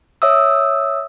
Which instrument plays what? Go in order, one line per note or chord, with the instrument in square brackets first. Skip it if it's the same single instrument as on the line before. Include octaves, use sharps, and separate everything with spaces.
[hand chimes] C#5 E5 D#6 E6